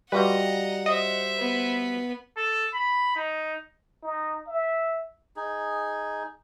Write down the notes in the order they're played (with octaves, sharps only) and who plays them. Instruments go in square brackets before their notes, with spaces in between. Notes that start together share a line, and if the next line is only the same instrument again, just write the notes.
[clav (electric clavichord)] G3 F4 F#4 [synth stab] B4 [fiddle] D#5 A#5 [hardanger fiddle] F#5
[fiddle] C5 E5 [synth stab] D#5
[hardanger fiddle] B3 B4
[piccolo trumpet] A4
B5
D#4
[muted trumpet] D#4
E5
[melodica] D#4 G#4